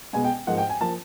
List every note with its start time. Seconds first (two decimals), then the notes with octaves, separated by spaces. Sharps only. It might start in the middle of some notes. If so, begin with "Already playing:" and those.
0.13 B2 G#3 B3 G#5
0.24 G5
0.47 G#2 F3 A#3 F#5
0.58 G5
0.69 G#5
0.81 F3 A#3 A5